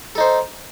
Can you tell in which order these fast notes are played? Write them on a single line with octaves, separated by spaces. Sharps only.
A4 D#4 C5